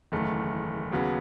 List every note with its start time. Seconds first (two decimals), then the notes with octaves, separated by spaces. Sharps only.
0.12 F#1 E2 D#3 A3
0.92 D#2 C#3 F#3 B3